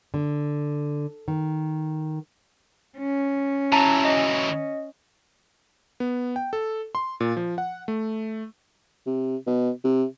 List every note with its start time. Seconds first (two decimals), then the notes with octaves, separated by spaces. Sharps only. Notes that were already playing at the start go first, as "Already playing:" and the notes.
0.14 D3
1.28 D#3
2.98 C#4
3.72 E3 F#3 A5 A#5
4.05 D#5
6.00 B3
6.36 G5
6.53 A4
6.95 C6
7.20 A#2
7.37 F3
7.58 F#5
7.88 A3
9.07 C3
9.47 B2
9.84 C3